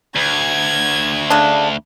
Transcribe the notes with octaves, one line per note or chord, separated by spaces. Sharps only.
D2 G#6
C#3 D4